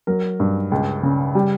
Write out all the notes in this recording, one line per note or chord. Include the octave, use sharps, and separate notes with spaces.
F#3 A#4
G2
C#2
C#3
G3